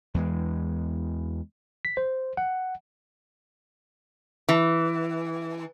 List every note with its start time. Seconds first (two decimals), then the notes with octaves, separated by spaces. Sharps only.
0.14 E2 E3 G#3
1.85 B6
1.97 C5
2.37 F#5
4.49 E3